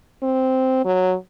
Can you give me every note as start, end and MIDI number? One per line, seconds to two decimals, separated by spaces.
0.23 0.81 60
0.85 1.14 54